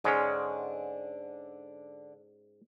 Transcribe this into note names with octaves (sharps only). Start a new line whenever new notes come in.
G#2 D3 G#3 C#4 D4 G5